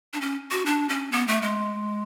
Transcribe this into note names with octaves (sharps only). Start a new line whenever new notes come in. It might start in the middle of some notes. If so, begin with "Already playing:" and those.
D4
C#4
F#4
D4
C#4
B3
A3
G#3